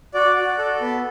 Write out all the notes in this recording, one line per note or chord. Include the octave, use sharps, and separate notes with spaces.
F#4 D5
F#4
A4
B3